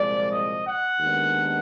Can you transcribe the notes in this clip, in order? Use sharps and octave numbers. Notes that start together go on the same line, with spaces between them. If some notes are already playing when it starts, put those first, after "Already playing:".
Already playing: C2 A#2 F3 G#3 D5
D#5
F#5
D#2 D#3 G#3 B3 D4